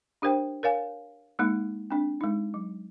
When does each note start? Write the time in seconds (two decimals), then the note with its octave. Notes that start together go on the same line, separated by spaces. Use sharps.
0.22 D4 G4 A#4 C5 G5
0.63 A#4 C#5 F5 G#5
1.39 G#3 A#3 D#4
1.90 C4 D4
2.21 G#3 D#4
2.54 F#3